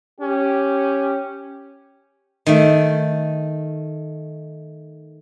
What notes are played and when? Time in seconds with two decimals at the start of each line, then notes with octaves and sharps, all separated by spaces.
0.19 C#4 G4
2.46 D#3 A3